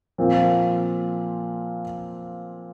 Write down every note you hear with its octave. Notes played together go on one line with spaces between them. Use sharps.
A#2 F3 C4 F4